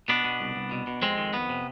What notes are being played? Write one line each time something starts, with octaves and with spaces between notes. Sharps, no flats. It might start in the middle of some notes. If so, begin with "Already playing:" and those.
B2 B3 D4
B2
C2
C2
B2
B2
F2 G#3 C4
D#3
F2 B3
C3